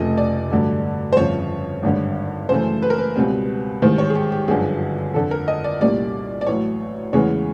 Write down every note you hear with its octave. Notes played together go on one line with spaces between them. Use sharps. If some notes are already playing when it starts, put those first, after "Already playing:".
Already playing: F1 F2 C#3 F3 A3 D#5
D5
G2 D3 F#3 A3
C5
G1 F2 C#3 F3 C#5
G#1 G2 D3
F#2 C#3 E3 A3 C5
B4
A#4
B4
C#2 B2 G3 C4
A1 G#2 D#3 G3 C5
C#5
G#4
G4
G4
G1 F#2 D3 F3 G#4
F2 D3 F3 A4
A#4
D#5
D5
C2 A#2 G3 A#3 C#4 D5
D5
A1 A2 F#3 C#5
E2 C#3 E3 G#3 B3 C#5